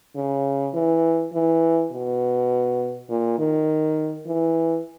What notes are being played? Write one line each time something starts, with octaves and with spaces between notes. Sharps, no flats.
C#3
E3
E3
B2
A#2
D#3
E3